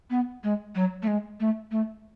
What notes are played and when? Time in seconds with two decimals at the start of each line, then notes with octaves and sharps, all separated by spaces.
0.10 B3
0.44 G#3
0.75 F#3
1.02 A3
1.07 G#3
1.40 A3
1.71 A3